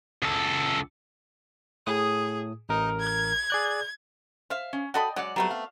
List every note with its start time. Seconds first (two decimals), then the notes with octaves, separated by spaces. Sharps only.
0.22 C#2 A4
1.87 A2 G#4 D#6
2.69 A1 D#4 A#4
3.00 G#6
3.50 G#4 D5 F#6
4.50 C5 E5 F5
4.73 C#4
4.94 F#4 A4 D5 D#5 G5 B5
5.16 F#3 G#3 D5 F#5
5.36 F#3 G3 A3 B3 C4
5.51 F5